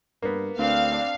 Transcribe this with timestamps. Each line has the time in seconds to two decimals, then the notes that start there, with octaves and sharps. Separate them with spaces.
0.22 G2 A#3 B3
0.58 D2 C4 D4 F5